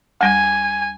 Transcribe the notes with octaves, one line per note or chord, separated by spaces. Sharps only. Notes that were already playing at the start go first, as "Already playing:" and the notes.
D2 G3 G#5